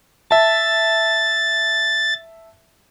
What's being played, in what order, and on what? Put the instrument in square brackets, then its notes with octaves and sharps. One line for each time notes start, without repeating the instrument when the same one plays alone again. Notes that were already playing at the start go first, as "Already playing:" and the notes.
[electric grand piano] E5 A5 [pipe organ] A6